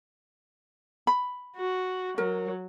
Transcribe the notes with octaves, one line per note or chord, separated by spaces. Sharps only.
B5
F#4
F#3 A#4